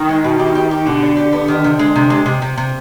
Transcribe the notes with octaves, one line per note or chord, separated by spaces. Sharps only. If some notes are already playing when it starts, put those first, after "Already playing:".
Already playing: D#3
G#3
B2
G4
G4
G4
B2 D3
D4
G4
B3
D#3
C3
G#3
C3
G#3
C3
C3
C3